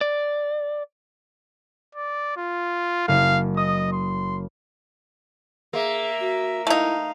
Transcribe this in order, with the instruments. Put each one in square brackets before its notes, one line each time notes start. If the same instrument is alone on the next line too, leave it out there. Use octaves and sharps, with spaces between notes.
[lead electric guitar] D5
[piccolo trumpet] D5
F4
[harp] F#1 [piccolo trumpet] F5
[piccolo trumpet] D#5 [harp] D#6
[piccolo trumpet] C6
[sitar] A#3 [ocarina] G#4 [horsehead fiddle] E5
[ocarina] F#4
[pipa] A3 D#4 [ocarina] E4 [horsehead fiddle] F5